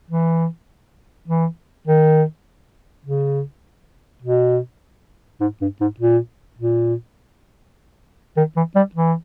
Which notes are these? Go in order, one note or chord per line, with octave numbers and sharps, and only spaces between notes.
E3
E3
D#3
C#3
B2
G#2
G2
G#2
A#2
A#2
D#3
E3
G3
E3